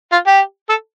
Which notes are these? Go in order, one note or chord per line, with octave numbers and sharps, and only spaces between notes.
F4
G4
A4